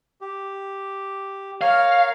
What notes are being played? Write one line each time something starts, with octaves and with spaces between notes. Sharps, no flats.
G4
A#4 C#5 F5 F6